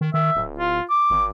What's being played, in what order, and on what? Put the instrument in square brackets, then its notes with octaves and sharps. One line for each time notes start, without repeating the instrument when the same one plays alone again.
[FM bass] D#3
[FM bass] D#3 [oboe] E5
[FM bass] D1
[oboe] F4
D6
[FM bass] G#1